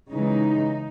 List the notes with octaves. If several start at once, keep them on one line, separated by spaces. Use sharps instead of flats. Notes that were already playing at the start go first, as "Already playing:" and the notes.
C#3 E3 G#3 D#4